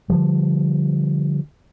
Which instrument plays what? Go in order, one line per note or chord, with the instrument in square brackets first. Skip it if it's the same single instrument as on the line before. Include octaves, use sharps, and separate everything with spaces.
[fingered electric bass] D3 F3 G3